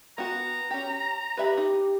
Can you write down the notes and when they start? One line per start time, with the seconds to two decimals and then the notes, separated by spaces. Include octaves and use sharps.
0.18 B3 F#4 A#5
0.71 C#4 G4
1.37 G4 B4 E5 B5
1.57 D#4